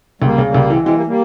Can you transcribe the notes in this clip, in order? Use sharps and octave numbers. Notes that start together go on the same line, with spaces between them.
C#2 G3 A#3
C#3
G3 A#3
C#2
E3 G#3 C4
E3 G#3 C4
G3 A#3
G3 A#3